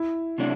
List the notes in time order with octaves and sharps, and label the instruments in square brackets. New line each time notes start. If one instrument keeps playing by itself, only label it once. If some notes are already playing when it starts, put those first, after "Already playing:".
Already playing: [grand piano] E4
[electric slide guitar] C3 F#3 A3 D4